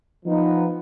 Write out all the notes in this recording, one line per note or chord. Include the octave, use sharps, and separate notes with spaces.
F3 B3 D#4